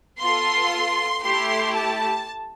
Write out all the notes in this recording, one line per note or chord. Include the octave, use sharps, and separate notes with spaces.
B3 F4 A4 C6
A3 E4 G4 C6
A5